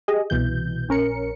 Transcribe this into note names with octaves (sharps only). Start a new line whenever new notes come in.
G4 G#4 D#5
C2 B2 E3 G6
A#1 C#4 A#4 C#7